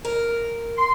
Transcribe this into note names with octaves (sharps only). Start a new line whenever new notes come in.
A#4
C6